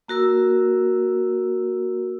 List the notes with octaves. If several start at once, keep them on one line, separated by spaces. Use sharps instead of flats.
A#3 F#4 A#4 E6